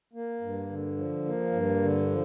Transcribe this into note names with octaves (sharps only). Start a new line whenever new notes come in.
A#3
G2
D3
F3
A#3
G2
D3
F3